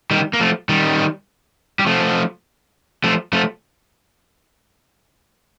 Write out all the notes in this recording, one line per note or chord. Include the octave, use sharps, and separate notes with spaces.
D#3 G3
A#3
F3 A3
D#3 G3
G3
F3 A3
F3 A3
F3 A3